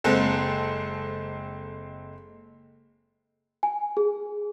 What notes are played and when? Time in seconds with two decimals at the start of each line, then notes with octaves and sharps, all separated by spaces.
0.04 F#1 G#3 C4 A4
3.63 G#5
3.97 G#4